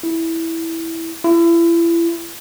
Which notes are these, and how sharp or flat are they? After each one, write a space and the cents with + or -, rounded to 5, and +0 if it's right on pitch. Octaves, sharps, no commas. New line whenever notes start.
E4 -5
E4 +35